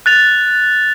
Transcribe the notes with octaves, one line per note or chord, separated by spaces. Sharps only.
F#6 A6 F7